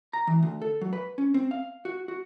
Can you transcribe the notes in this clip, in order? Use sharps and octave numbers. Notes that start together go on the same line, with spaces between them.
A#5
E3
D2
A4
F#3
B4
C#4
C4
F5
F#4
F#4